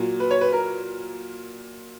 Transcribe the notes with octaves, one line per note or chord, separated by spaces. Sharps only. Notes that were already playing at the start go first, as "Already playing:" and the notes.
Already playing: A#2 F#3
B4
C#5
B4
A#4